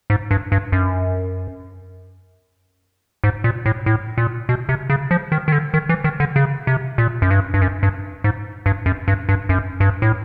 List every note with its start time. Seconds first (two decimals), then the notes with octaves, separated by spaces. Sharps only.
0.10 G#2
0.31 G2
0.52 G2
0.72 F#2
3.24 G#2
3.44 A#2
3.66 A2
3.86 A2
4.18 A#2
4.49 B2
4.69 C3
4.90 C#3
5.11 F3
5.32 D#3
5.48 D#3
5.52 D3
5.74 D#3
5.89 E3
6.04 D#3
6.20 D3
6.36 C#3
6.67 C3
6.98 A#2
7.22 F#2
7.31 G2
7.54 G2
7.62 F#2
7.83 G2
8.24 G#2
8.66 G2
8.86 F#2
9.08 G2
9.29 G2
9.49 F#2
9.80 G2
10.02 A2